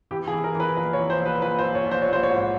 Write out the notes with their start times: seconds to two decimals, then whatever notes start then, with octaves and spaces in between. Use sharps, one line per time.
0.11 E3 G4
0.28 G#4
0.32 E3
0.44 A#4
0.55 E3
0.60 B4
0.77 A#1 B4
0.93 C#5
0.99 E3
1.10 C5
1.20 A#1
1.26 B4
1.42 A#1 B4
1.59 C5
1.64 A#1
1.75 C#5
1.85 A#1
1.91 C5
2.02 C#5
2.08 A#1 C5
2.23 C#5
2.30 G#2 C5